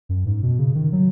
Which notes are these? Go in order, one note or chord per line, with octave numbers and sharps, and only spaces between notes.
F#2
G#2
B2
C#3
D#3
F#3